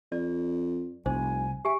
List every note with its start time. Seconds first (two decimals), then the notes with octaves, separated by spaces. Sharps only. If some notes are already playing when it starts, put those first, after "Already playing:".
0.12 F2 D5
1.06 F1 C2 C5 G#5
1.65 G4 E5 G#5